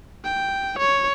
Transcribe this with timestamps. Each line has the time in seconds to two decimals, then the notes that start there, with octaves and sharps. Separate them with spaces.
0.24 G5
0.79 C#5